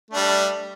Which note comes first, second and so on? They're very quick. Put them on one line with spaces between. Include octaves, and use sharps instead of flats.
A3 D4 G3